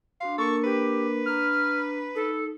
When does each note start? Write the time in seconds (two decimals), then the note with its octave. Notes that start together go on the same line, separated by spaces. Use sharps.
0.21 D4 F#4 F5 C6
0.38 A#3 D4 A4 A#4 C#6
0.64 G4 B4
1.25 D4 A#5 F6
2.15 D#4 A4